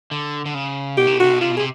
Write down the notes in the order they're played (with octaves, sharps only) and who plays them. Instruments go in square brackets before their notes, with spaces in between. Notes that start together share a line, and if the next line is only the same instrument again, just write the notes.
[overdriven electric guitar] D3
D3
C#3
[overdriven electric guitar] B2 [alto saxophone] G4
[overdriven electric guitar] C3
B2
[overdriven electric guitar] C3 [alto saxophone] F#4
[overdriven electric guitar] B2
[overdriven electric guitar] C3 [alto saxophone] F4
[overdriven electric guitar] B2
[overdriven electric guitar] C3 [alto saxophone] G#4